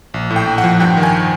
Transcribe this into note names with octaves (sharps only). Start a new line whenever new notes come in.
A#1
A2
G5
A#1
F#5
F3
G2 G5
D#3
G#5